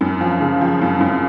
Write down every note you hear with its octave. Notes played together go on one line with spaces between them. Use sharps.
F#2
F3
C#3
F3
F#2
F#2